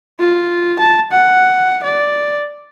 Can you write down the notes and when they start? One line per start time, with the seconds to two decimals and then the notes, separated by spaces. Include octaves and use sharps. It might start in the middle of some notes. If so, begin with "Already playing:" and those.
0.20 F4
0.79 A5
1.12 F#5
1.83 D5